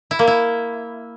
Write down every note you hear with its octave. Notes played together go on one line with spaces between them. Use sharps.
E4
A#3
E4